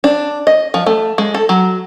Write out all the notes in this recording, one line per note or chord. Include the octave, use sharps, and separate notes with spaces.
D4
D#5
F3
A3
G#3
A4
F#3